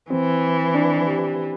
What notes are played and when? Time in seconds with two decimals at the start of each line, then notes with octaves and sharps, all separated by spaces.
0.10 E3 C4
0.74 D4
1.06 G4